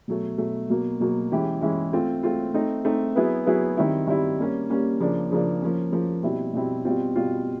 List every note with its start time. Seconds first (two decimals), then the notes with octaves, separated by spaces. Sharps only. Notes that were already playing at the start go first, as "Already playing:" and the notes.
0.08 B2 F#3 A3
0.38 B2 F#3 A3
0.70 B2 F#3 A#3
1.00 B2 F#3 A#3
1.32 E3 G#3 C#4 E4 G4
1.61 E3 G#3 C#4 E4 G4
1.93 A3 C4 F4
2.23 A3 C4 F4
2.54 A3 C4 D#4
2.85 A3 C4 D#4
3.16 F#3 B3 E4 G#4 B4
3.47 F#3 B3 E4 G#4 B4
3.77 D#3 G3 C4 E4
4.07 D#3 G3 C4 E4
4.39 G3 A#3 C#4
4.70 G3 A#3 C#4
5.00 C#3 F3 A#3 D4
5.31 C#3 F3 A#3 D4
5.62 F3 A#3 C#4
5.92 F3 A#3 C#4
6.23 B2 G3 C4 E4
6.53 B2 G3 C4 E4
6.85 B2 G3 C4 F4
7.15 B2 G3 C4 F4